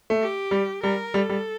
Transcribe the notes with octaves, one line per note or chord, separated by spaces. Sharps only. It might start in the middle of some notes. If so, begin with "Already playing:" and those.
A3
G4
G3
G3 A#4
G3 A4
G3